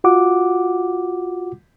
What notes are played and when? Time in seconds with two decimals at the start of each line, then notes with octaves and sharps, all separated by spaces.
0.04 F4 F#4 F#5 D6